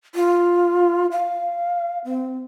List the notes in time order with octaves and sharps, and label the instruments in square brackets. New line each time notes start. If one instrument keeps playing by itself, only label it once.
[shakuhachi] F4
F5
C4